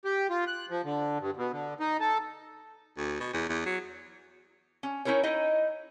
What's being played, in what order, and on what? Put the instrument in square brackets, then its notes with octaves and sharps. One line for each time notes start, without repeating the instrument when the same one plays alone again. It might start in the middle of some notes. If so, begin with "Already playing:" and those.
[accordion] G4
F4
F#6
F3
D3
G2
B2
D3
D#4
A4
[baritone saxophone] D2
B2
E2
E2
F#3
[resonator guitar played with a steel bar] C#4
C#4 D#4 E4 A#4 C#5
D#4 E4 D#5